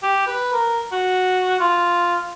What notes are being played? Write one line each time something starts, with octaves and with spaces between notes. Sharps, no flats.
G4
B4
A#4
F#4
F4